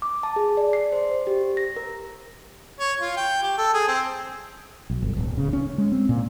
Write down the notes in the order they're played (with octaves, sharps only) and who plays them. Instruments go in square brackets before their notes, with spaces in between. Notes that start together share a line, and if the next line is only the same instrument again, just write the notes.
[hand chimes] D6
A5
G#4
D5
C7
C5
C5
G4
A#6
A#4
[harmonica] C#5
F4
G5
G4
A4
G#4
C4
[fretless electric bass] B1
G1
D1
C#3
C#4
G#3
C4
A#2